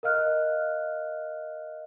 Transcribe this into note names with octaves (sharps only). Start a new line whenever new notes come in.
A#4 D#5 F5 F6 F#6